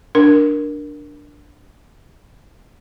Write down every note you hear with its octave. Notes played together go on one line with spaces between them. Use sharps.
D4 A#4